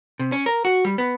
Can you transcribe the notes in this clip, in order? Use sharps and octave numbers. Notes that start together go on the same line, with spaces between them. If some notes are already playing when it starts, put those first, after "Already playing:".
C3
C#4
A#4
F#4
G3
B3